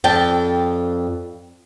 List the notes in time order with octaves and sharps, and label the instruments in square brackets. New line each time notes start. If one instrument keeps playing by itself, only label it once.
[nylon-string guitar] F2 D5 G5 A5